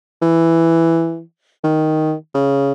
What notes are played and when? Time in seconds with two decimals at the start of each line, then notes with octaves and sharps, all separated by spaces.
0.22 E3
1.64 D#3
2.34 C#3